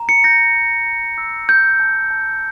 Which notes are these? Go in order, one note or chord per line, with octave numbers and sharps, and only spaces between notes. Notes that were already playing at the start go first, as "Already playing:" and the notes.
Already playing: A#5
C#7
G6 A#6
G6
A#5
E6
G6
A5
A5